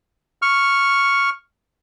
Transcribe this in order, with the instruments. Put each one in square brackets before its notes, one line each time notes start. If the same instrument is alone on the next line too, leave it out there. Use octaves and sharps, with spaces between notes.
[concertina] C#6 F6